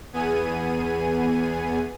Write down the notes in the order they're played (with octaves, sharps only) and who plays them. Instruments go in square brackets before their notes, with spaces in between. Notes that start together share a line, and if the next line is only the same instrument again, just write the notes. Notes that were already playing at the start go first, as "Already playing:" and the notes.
[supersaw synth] E2 B3 G#4 G#5 D#7